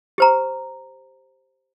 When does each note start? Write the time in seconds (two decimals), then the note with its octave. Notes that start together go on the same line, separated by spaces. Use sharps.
0.18 G4 C5 A#5